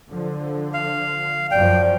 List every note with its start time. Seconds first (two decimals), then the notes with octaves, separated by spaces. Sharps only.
0.10 D3 F3
0.74 F5
1.51 F#2 F3 D5 G5